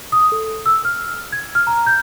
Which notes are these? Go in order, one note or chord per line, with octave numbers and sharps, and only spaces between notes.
D#6
A4
E6
F6
G#6
F6
A#5
G6